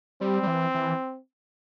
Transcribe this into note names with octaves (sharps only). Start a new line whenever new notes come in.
G3 C4
G3
E3
E3